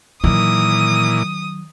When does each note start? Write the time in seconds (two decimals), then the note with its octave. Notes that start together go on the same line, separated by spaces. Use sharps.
0.24 A#2 D#3 E3 F#3 D#6